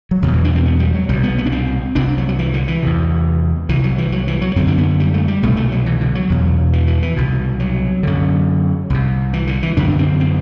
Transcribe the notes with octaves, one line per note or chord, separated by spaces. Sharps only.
F#3
E2 B2 D3
E3
D4
C4
B3
G3
F#3
C2 B2 G3
B3
B3
D4
C4
C2 C3 D4
F#3
F#3
E3
D3
E3
E2 C3
C2 C3 E3
F#3
E3
F#3
E3
F#3
F#2 D3 C4
D4
B3
G3
A3
G3
C2 B2 A3
A3
F#3
E3
D3
F#3
E2 B2
E3
E3
E3
C2 B2
F#3
F#2 D3
C2 C3
E3
D3
E3
F#2 D3 D4
C4
C4